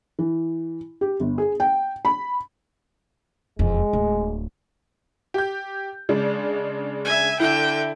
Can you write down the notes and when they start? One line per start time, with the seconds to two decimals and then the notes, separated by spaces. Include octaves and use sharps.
0.19 E3
1.01 G4
1.20 G1
1.38 G#4
1.60 G5
2.05 B5
3.59 E1 F2 G#3
3.93 D1
5.34 G4 G6
6.09 C#3 G#3 D4
7.05 E5 G#5
7.40 D3 E4 G5